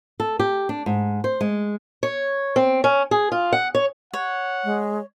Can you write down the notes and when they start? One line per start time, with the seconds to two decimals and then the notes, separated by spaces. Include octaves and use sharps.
0.20 A4
0.39 G4
0.69 D4
0.86 G#2
1.24 C5
1.41 G#3
2.03 C#5
2.56 C4
2.84 C#4
3.11 G#4
3.32 F4
3.53 F#5
3.75 C#5
4.13 C#5 F#5
4.64 G#3